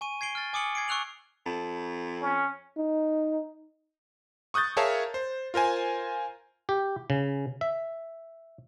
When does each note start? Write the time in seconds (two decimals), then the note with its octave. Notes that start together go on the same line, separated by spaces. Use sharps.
0.01 G#5 C#6 D#7
0.21 G#6 C7 D7 G7
0.35 F6 A6
0.53 G#5 D6 D#6 C#7 F#7
0.75 G#6 C7 D7
0.88 C#6 E6 F#6 F7 F#7
1.46 F2
2.22 C#4
2.77 D#4
4.54 C#6 D#6 F#6 G6 A6
4.77 G#4 A#4 C#5 E5 F5 A5
5.14 C5
5.54 F4 A#4 C5 G#5
6.69 G4
7.10 C#3
7.61 E5